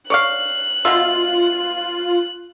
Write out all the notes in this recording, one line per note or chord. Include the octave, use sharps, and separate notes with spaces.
C#5 D5 F5 F#6
B2 F4 E5